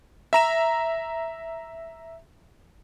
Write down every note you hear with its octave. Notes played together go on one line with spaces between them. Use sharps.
E5 A#5 E7